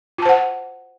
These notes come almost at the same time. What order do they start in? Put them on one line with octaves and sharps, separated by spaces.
F4 A5 C5 F#5